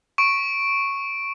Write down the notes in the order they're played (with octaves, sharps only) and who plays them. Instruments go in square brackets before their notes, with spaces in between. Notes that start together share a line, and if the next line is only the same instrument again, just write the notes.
[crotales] C#6 D7